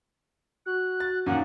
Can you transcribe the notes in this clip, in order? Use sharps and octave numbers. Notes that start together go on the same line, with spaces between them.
F#4 F#6
A6
F#2 A#2 D#3 F#5